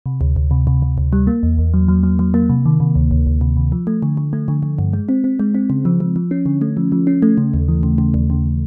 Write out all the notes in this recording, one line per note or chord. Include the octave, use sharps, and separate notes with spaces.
C3
D2
D2
C3
C3
C3
D2
G3
A#3
E2
E2
F#3
F#3
F#3
F#3
A#3
C3
D#3
C3
D2
D2
D2
C3
C3
F3
A3
D3
D3
A3
D3
D3
G2
G#3
C4
C4
G#3
C4
C#3
F3
F3
F3
C#4
D3
A3
F3
F3
C#4
A3
C#3
D#2
E3
C#3
C#3
D#2
C#3